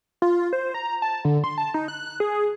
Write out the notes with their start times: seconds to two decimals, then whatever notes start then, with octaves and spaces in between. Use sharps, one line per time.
0.22 F4
0.53 C5
0.74 A#5
1.02 A5
1.25 D3
1.44 C6
1.58 A5
1.74 D#4
1.88 F#6
2.20 G#4